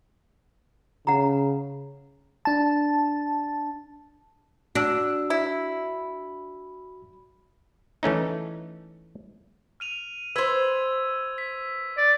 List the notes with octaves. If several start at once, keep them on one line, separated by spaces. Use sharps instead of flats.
C#3 F#5 A#5
D4 A5
D4 F#4 E6
E4
E3 A3 C#4 D#4
F6 D#7 F7
B4 C5 E6 G#6
B6
D5